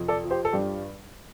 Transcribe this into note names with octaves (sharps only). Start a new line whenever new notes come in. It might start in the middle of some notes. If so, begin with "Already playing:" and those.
Already playing: F2 C3
A4 D5
F3
G4 C5
A4
G2 D4 G4